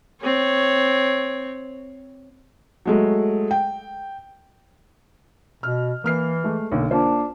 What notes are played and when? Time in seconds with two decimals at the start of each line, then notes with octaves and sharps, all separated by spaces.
0.21 C4 C#5
2.86 F#3 G#3 A3
3.51 G5
5.63 B2 F6
6.04 E3 A#3 F6 C7
6.44 G#3 A3
6.72 B1 D3 A#3
6.91 A#3 D4 F4 C5